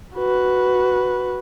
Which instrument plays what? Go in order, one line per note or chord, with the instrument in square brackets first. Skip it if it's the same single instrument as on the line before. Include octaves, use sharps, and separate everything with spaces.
[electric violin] F#4 B4